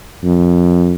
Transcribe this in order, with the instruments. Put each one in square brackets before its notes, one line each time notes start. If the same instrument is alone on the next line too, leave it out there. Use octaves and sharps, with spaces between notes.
[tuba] F2